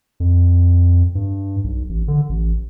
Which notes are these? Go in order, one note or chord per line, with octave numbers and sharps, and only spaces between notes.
F2
G2
B1
A1
D3
A1